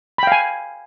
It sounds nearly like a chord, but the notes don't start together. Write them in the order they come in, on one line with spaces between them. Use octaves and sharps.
B5 G5 F5 G#5